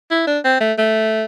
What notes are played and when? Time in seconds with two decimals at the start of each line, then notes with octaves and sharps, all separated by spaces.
0.11 E4
0.27 D4
0.45 C4
0.61 A3
0.78 A3